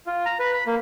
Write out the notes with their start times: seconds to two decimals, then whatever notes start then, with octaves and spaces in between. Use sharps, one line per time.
0.07 F4
0.26 A#5
0.39 B4
0.54 B5
0.67 A#3